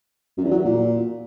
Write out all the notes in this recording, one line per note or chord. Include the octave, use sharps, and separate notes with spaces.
F#2
E2
F#3
E2
A#2